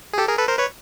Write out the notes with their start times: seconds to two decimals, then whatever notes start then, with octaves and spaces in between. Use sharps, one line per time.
0.13 G#4
0.18 G4 A4
0.28 G#4 A#4
0.38 A4 B4
0.48 A#4 C5
0.58 B4 C#5